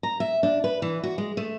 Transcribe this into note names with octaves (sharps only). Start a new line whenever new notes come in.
A#5
E5
D4
B4
E3
F#4
G#3
A3